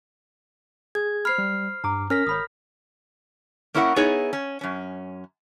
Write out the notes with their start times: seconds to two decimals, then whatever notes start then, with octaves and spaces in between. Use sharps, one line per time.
0.95 G#4 G#6
1.25 C5 B5 F6 C7
1.38 G3
1.84 G2 A#5 D6
2.10 C#4 A#4 F6 A#6 B6
2.27 G#1 C#5 B5 D#6
3.74 A#3 C#4 E4 A#4 C#5 F#5
3.96 B3 D#4 E4 G#4 C#5
4.33 C#4
4.61 F#2 C#4